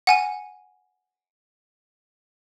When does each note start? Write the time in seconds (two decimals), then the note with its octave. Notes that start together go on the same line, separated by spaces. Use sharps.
0.07 F#5 G#5 D#7